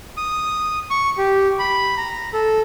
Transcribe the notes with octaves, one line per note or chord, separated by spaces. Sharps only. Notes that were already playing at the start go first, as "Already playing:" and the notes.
D#6
C#6
G4
B5
A#5
A4